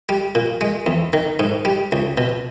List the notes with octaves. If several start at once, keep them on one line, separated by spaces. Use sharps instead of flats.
G3
A#2
G#3
E2
D#3
G#2
G3
C#2
B2